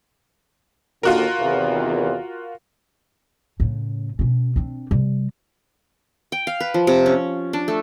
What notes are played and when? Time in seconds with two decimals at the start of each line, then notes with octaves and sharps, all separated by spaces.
1.03 D#2 D3 A#3 F4 F#4 A#4
1.40 E2 C3 D#3
3.60 A2 C#3
4.19 B2 C#4
4.56 C4 D4
4.91 C3 G3
6.32 G5
6.47 F5
6.60 B4
6.74 F3
6.87 C3
7.06 C#4
7.53 D4
7.68 A3